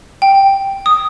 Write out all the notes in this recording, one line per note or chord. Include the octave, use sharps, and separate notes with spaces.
G5
D#6